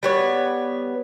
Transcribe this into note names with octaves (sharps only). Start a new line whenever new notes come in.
G3 B3 C#5